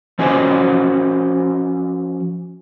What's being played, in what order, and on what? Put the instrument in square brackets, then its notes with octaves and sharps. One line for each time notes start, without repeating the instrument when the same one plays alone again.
[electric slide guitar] F3 C#4 F#4 C5 D#5 G#5